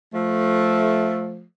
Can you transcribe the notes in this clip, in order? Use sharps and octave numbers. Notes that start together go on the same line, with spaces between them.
F3 A3